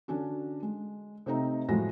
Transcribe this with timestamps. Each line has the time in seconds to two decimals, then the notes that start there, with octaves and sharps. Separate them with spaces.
0.08 D3 C#4 D4 F#4
0.63 G#3
1.26 C3 A3 C4 D#4 D#5 A#5
1.69 A2 F3 F#3 G#3 F#4 A#6